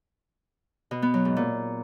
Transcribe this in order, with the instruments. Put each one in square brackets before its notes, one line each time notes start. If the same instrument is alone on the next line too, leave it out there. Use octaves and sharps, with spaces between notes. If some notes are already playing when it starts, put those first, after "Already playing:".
[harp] B2
B3
F#3
G#2
A#2